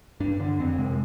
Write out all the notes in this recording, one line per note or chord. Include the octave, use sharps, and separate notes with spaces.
G2 D4
D3 D4
F2 C4
C3 G#3